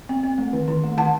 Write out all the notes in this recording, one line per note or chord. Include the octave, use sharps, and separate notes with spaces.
C4
C4
A3
D#3
D#3
A3
D#3 F#5 A5